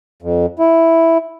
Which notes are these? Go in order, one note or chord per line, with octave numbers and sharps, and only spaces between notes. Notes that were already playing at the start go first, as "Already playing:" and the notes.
F2
E4